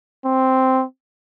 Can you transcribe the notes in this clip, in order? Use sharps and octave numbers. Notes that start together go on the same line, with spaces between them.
C4